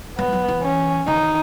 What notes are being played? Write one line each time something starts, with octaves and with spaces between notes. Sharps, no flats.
F#3 B3
F#3
E3
C#4
D#3 D#4